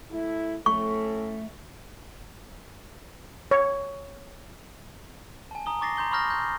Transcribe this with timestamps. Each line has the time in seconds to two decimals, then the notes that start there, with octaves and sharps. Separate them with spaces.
0.11 A3 E4
0.66 A2 A3 C#4 A4 C#6
3.51 C#5
5.51 G#5 A5
5.66 A#5 D#6 G7
5.81 C#6 D6 A6 A#6 C7
5.97 A#5 C6 G6 G7
6.12 B5 C#6 D#6 F6 G6 A#6
6.30 G6